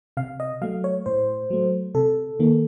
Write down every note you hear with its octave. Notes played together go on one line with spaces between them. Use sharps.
C3 F5
D#5
F#3 A3 F5
C#5
A2 C5
F#3 A3
C3 A4
D#3 A#3